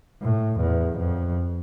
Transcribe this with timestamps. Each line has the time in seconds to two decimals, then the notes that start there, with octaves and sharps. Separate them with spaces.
0.22 A2
0.60 E2
0.98 F2